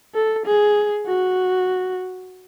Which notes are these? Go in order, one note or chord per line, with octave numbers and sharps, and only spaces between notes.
A4
G#4
F#4